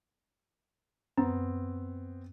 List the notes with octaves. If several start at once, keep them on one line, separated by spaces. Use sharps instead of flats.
F#2 B3 C4